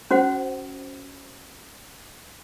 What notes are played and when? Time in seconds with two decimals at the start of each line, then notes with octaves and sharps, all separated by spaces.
0.11 C#4 F#4 C5 F#5